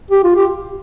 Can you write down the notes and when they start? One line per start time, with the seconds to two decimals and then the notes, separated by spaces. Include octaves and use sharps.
0.11 G4
0.24 F4
0.36 G4